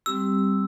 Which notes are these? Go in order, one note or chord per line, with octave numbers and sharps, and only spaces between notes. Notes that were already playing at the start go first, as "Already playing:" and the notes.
G3 C4 G4 E6